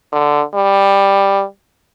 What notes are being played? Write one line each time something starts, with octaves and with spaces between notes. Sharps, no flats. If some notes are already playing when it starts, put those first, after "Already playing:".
D3
G3